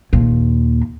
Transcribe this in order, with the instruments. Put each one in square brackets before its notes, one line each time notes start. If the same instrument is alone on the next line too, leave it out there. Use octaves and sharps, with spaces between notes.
[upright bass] D#2 A#2